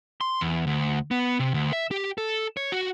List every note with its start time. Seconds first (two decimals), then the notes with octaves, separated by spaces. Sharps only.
0.21 C6
0.41 E2
0.67 D2
1.11 B3
1.39 C3
1.54 D2
1.73 E5
1.91 G4
2.18 A4
2.57 C#5
2.72 F#4